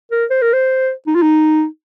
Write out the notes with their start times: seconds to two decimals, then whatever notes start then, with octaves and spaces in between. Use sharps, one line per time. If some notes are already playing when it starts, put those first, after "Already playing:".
0.12 A#4
0.30 C5
0.42 A#4
0.53 C5
1.07 D#4
1.15 F4
1.22 D#4